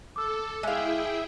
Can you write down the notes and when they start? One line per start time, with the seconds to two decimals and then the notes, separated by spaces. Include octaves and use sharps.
0.16 A4 D6 E6
0.63 G#3 E4 G#4 E5 F5 G5